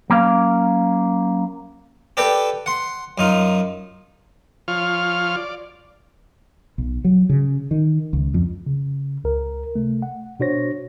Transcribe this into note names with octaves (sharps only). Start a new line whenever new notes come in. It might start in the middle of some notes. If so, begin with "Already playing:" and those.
F#3 A#3 C#4 F5
G4 A4 B4 D5 G5 A5
F#5 C6
F#2 D#4 F4
F3 F4 C#5 F6
D5
B1
F#3
C#3
D#3
C#2
F2
C#3
C#2 A#4
C3 A3
F#5
B2 D4 F#4 C5 C#5 A#6